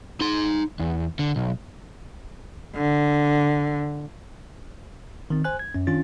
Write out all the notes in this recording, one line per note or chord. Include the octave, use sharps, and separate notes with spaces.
D#4 C6
E2
D3
B1
D3
D#3 C4
C5 G#5 F#6
G#6
F#2 C#4
D#3 C#4 D4 F4 A6